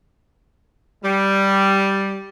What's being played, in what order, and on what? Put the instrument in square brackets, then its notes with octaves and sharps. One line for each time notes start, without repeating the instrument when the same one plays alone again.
[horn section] G3